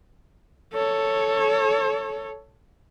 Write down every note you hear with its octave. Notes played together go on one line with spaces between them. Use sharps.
A4 C#5